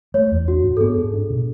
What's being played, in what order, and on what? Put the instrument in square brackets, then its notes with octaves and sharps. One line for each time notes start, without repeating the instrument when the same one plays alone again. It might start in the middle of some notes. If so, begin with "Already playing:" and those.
[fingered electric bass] A3 [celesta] C#5
[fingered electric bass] E2
[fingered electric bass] D4 [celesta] F#4
[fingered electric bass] G#2
[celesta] A4
[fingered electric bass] B3 [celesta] G#4
[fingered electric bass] G#2
D4
B2